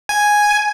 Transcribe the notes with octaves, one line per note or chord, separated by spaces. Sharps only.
G#5